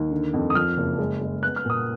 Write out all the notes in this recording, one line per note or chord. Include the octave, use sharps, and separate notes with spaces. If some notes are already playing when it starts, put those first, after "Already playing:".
Already playing: D#2
D3
F2
D#6
F3 F6
F#1
G#3
G#3
B3 F#6
F6
A#2 D#6